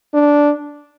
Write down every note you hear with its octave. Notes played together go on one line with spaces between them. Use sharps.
D4